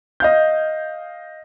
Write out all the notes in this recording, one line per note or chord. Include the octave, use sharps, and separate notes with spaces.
D#5 F5 G6